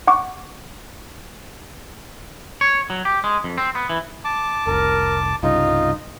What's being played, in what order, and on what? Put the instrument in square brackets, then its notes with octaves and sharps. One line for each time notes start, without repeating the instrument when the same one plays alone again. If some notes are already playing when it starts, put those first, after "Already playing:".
[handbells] F#5 C#6 D6
[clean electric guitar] C#5
F#3
G4
G#3
F2
C4
B3
E3
[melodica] A5 D6
[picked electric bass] F1 C2 [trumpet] A#4
[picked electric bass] C2 G2 C#3 [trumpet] D#4 [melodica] F4